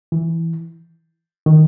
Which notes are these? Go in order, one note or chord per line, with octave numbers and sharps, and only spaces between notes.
E3
D#3